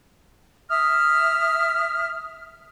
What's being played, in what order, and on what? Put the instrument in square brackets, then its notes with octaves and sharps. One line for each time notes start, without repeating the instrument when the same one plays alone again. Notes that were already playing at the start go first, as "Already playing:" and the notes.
[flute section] E5 D#6 F6